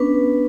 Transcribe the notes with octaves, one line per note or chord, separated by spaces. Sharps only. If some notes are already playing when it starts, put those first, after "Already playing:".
Already playing: B3 C#4 D4 B4